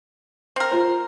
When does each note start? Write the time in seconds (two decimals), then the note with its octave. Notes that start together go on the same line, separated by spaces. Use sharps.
0.56 C4 A#4
0.72 F4 C5